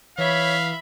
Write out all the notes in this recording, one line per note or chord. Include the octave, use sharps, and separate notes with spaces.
E3 C#5 E5 F5 B5